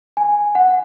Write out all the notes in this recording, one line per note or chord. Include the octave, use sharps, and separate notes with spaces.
G#5
F#5